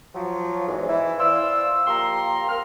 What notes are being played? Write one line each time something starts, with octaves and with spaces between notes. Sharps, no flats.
F3 F#3
E2 G#2
E3 E4
C5 D5 F5 E6
F3 A#3 G4 A#5 C6
A#3 F6